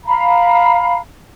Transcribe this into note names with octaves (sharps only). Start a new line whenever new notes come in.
F5 A#5 B5